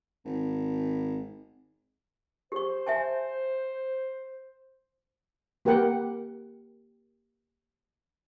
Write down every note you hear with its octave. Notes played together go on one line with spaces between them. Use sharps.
G#1
G4 C5 C#6
E5 G#5 A5
A#3 G4 A#4 B4 F#5 G5